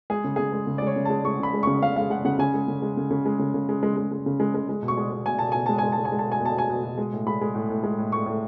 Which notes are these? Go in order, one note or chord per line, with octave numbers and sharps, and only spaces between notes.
G#3 G#4
C#3
C#3 G#4
G#3
C#3
D5
G#3 C#5
C#3
A5
G#3
G#3 C#6
C#3 B5
G#3
C#6
C#3
C#3 F5
G#3 F5
G#3 F#5
C#3 F#5
C#3 G#5
G#3
C#3
G#3
C#3
C#3
G#3
C#3
C#3
G#3
G#3
G#3
G#3
C#3
G#3
G#3
G#3
B2
C#6
G#3
G#3
B2 G#5
B2 A5
B2 G#5
G#3 A5
G#5
G#3
A5
G#3
G#5
G#3
A5
B2
G#5
B2 A5
B2 G#5
B2
B2
G#3
A2
G#3 B5
G#3
A2
A2
G#3
A2
A2 C#6
A2